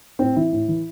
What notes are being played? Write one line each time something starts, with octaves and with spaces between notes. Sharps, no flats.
A2 C4
E3 E4
A2
E3